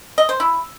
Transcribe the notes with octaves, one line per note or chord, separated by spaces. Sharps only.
D#5
C5
E4